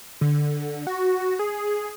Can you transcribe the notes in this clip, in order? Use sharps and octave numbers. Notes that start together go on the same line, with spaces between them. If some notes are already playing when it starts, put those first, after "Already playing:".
D3
F#4
G#4